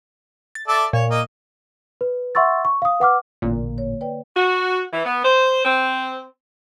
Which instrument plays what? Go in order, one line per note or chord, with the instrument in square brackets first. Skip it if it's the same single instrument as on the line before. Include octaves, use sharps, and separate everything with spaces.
[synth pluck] A6
[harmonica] A4 D5 E5
[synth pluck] A#2 [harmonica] C#5
[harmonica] A#3 D#5
[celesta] B4
E5 F#5 C6 C#6 E6 A6
C#6
F5 D#6
B4 F#5 D6 F6
[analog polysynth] A1 A#2 [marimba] D3 A#3
[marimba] C#5
B4 D5 G5
[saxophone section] F#4
E3
B3
C5
C4